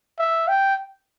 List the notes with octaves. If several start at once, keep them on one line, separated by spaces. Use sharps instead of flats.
E5
G5